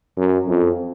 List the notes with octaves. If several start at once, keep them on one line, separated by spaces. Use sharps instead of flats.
F#2
F2